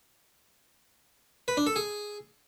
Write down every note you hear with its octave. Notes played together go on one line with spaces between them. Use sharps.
B4
D4
A4
G#4